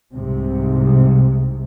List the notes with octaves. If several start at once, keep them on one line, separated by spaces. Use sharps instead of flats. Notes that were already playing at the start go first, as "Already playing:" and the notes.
C2 G#2 C3